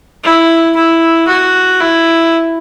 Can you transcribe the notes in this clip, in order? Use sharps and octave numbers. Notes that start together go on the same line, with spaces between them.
E4
E4
F#4
E4